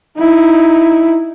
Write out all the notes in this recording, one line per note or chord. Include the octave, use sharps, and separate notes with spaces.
D#4 E4